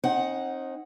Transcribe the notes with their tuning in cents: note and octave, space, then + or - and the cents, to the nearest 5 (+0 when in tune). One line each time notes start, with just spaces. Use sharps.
C4 +40 D#4 +0 F#5 +0